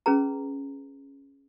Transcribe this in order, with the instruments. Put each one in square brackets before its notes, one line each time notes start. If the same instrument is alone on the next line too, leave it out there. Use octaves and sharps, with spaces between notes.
[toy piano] C#4 G#4 B4 A#5